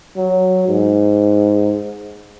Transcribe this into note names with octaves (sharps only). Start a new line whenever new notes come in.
F#3
G#2